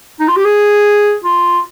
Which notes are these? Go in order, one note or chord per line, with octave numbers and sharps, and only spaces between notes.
D#4
F4
G4
G#4
F4